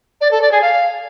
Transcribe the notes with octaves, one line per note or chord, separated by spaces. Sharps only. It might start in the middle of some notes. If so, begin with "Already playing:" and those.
D5
A4
D5
G#4
F5